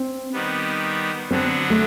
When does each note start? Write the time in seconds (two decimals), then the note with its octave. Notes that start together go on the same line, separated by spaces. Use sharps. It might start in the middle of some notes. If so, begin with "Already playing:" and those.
Already playing: C4
0.33 D#3 G3 B3
1.30 D3 F#3 B3 C4 D4
1.70 A3